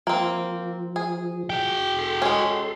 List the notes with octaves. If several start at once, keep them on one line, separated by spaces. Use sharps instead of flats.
F3 A#3 C4
G#4
F#4 G5
A4 C6
G#3 C#4